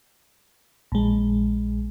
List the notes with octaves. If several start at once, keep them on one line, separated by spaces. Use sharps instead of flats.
A#1 G#3